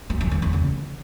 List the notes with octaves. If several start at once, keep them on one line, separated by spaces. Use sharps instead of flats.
F#3
F2
E2
E2
C#3